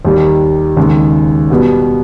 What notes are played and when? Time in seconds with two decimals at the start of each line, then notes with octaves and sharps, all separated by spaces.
0.05 D#2 D#3 G3
0.77 D#2 C#3 G#3
1.50 B2 G3 B3